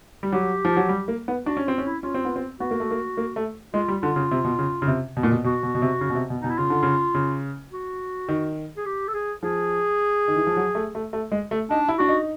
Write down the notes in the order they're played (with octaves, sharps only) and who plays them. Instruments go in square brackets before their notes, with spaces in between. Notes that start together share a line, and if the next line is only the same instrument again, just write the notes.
[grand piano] G3
[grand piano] F#3 [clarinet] G4
[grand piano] F3
F#3
G3
A#3
B3
[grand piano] D4 [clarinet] F#4
[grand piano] C#4
[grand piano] C4 [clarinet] F4
[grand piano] C#4
[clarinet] E4
[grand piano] C#4 [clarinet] F4
[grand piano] C4
B3
C4
[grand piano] B3 [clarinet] F#4
[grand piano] A#3
A3
A#3
A#3
A3
[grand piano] G#3 [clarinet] F4
[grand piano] G3
[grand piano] D3 [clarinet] F4
[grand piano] C#3
C3
B2
C#3
C#3
C3
B2
A#2
B2
[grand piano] B2 [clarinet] F#4
[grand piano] B2
B2
C3
C#3
B2
C3
B2
[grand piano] B2 [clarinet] D#4
[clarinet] E4
[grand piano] C#3 [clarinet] F4
[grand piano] D3
C#3
C#3
[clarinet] F#4
[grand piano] D#3
[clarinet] G#4
G4
A4
G#4
[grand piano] F3 [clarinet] G#4
[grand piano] D#3
E3
F3
F#3
A3
A3
A3
G#3
A3
[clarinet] D4 [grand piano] D#4
[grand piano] E4
[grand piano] D4 [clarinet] F#4
[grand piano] D#4